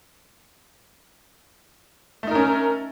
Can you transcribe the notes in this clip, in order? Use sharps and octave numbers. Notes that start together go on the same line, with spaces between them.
A3 C#4 D#4 A#4